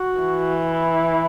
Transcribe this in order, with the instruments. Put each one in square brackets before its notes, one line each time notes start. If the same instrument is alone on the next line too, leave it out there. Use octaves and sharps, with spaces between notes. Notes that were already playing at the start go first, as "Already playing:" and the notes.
Already playing: [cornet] F#4
[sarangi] E3
[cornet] E4